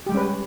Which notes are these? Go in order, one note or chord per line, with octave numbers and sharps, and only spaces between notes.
G3 G#3 C#4 G4 B4